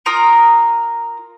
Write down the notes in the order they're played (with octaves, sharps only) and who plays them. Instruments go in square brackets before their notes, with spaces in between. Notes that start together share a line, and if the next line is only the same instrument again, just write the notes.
[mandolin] F4 A#4 A#5 D#6